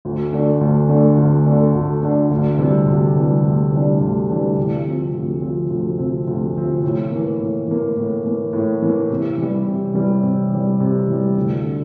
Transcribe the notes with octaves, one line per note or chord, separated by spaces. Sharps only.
D2
D3 A3 D4
D2
D3 A3 D4
D2
D3 A3 D4
D2
D3 A3 D4
D2
C3 E3 G3 D4
D2
C3 E3 G3 D4
D2
C3 E3 G3 D4
D2
C3 E3 G3 D4
D2
C3 F3 C4
D2
C3 F3 C4
D2
C3 F3 C4
D2
C3 F3 C4
A2
E3 A#3
A2
E3 A#3
A2
E3 A#3
A2
E3 A#3
C3
E3 G3
C3
E3 G3
C3
E3 G3
C3
E3 G3
D2
D3